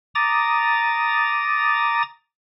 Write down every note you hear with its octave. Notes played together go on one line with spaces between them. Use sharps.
A#5 D6 D#6 A6